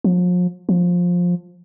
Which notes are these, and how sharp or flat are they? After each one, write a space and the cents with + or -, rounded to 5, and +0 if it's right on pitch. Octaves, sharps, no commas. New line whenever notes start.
F3 +40
F3 +15